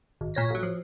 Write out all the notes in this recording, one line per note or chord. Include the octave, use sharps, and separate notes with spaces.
G#1
A#2 C#5 A#6 B6
A1 F#3
F3